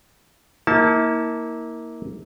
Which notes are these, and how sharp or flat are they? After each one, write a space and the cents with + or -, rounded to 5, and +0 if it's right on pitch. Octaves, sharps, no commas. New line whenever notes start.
A#3 +0 E4 -40 A5 +0